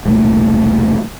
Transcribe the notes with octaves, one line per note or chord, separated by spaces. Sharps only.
E1 C2 A#2 A3